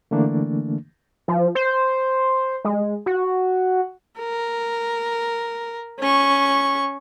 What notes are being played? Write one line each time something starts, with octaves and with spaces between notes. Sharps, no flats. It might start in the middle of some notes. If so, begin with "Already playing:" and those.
D3 E3 A3 A#3 D4
F3
C5
G#3
F#4
A#4
C#4 C#6